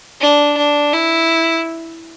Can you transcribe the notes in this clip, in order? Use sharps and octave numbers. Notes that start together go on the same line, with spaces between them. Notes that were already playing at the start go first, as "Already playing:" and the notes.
D4
D4
E4